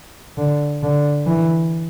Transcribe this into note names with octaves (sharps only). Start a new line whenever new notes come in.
D3
D3
E3